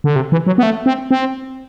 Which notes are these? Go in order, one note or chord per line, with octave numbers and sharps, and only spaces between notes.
D3
C3
E3
F#3
B3
A3
C4
C4